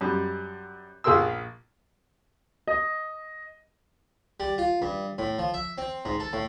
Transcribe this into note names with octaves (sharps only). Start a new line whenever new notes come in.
F#2 G3
A#1 G#4 A#4 C6 E6
D#5
G3
F4
G2
A2
F3
E5
C4
G#2
A4
A2